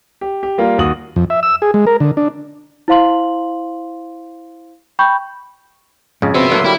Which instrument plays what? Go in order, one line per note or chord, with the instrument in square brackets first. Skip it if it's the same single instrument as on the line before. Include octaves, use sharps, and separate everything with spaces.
[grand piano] G4
G4
G3 A#3 F4
D#2 F#4 D#6 F#7
[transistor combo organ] F2
E5
E6
G#4
G#3
A#4
D3
D4
[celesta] E4 C5 F5 C6 F#7
G5 B5 C#6 G6
[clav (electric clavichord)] F2 C#3 [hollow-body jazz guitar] G#2
[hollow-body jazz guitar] C4 [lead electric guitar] F#4 B4 [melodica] E5 C6
[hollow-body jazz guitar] D3 A#3 [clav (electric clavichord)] F#3
[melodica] G3 B5 [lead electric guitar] E4